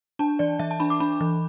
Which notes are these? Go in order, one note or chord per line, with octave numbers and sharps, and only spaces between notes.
D4 A5
E3 D5
E3 E5
A5
D4 B5
D6
D4 B5
E3